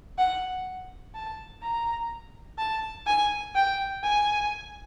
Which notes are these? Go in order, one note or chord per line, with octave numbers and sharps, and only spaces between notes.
F#5
A5
A#5
A5
G#5
G5
G#5